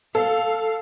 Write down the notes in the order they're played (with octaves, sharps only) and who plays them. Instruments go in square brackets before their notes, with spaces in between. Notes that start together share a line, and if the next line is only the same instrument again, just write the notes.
[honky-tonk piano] A4 [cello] F5